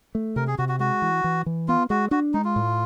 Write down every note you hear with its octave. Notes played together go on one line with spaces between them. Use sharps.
A3
C3 A#4
G#4
C3 F#4
F#4
G#3 F#4
E3
E3
E3
B3 F4
G#3 F#4
D4 F#4
G#3 D#4
F4
A2